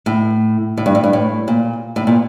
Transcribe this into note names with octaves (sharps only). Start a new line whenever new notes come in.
A2
A2
G2
A2
G2
A2
A#2
A2
A#2